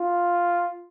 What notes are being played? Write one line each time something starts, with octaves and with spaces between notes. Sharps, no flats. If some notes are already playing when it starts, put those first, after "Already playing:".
Already playing: F4